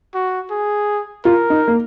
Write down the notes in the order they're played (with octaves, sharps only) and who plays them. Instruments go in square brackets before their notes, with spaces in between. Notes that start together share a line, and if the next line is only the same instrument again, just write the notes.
[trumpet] F#4
G#4
[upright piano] F4 [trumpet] A#4
[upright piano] D#4
A#3